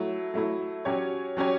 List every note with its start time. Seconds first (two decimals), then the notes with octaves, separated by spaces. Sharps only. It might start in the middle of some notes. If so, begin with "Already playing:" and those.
Already playing: F#3 A3 E4
0.34 F#3 A3 E4
0.85 F#3 C#4 G4 C#5
1.37 F#3 C#4 G4 C#5